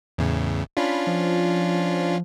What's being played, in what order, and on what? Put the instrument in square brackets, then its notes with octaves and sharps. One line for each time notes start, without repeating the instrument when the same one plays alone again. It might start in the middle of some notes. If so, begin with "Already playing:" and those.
[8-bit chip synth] E2 A2 C#3
[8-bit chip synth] C#4 D4 F4 [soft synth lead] B5
[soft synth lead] F3